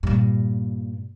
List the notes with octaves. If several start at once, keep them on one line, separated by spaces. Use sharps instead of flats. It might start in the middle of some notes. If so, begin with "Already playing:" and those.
G2 A#2